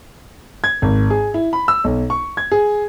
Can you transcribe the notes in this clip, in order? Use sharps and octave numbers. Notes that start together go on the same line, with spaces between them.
G#6
G#1
G#4
E4
B5
E6
B1
C#6
G#6
G#4